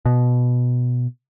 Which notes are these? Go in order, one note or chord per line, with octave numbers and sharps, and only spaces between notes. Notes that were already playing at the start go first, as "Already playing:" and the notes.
B2